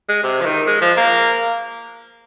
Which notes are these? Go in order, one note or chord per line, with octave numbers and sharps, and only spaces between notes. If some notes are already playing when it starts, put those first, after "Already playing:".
G#3
C3
F3
D#3
G#3
F3
A#3